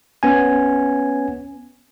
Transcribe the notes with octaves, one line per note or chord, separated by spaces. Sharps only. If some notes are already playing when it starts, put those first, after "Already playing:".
B3 C#4 G#5